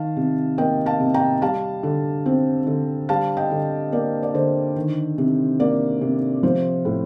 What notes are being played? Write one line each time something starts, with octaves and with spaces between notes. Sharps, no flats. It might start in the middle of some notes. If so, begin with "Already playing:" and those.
Already playing: D#3 F5 A5
C3
A#3 D#5 G5
F5 A5
C3
G5 A#5
G3 F5 A5
D3
C4
D3
G3 F5 A5
D#5 G5
D3
A#3 D5
D5
D3 C5
D#3
C3
A#3 D5
C3
F3 C5
A2